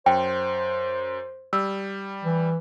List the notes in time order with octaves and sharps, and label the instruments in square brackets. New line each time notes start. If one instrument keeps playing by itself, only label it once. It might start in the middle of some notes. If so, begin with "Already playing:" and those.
[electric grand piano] F#2 [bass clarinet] C5 [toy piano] G5
[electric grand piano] G3 [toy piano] E6
[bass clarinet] E3